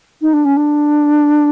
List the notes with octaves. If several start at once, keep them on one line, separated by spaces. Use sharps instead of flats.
D#4
D4
C#4
D4